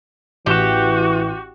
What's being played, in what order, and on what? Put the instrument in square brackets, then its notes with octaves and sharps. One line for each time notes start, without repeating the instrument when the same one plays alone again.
[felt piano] A1 E7 [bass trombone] E3 [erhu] F#4 [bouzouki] G4